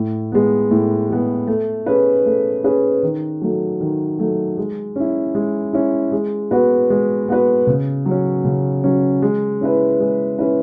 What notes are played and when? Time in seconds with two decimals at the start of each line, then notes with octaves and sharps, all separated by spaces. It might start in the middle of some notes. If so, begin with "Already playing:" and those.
Already playing: A2
0.32 G#3 B3
0.71 A2
1.10 G#3 B3
1.47 A3
1.86 C#4 G#4 B4
2.25 A3
2.64 C#4 G#4 B4
3.03 D#3
3.42 F#3 A3
3.80 D#3
4.19 F#3 A3
4.58 G#3
4.96 C#4 E4
5.35 G#3
5.73 C#4 E4
6.12 G#3
6.51 B3 F#4 B4
6.90 G#3
7.28 B3 F#4 B4
7.67 C#3
8.06 F#3
8.11 C#4
8.45 C#3
8.84 F#3 C#4
9.22 G#3
9.61 C#4 E4 B4
10.00 G#3
10.39 C#4 E4 B4